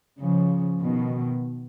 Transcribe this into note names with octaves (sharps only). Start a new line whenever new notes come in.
C#3 F3
B2 D#3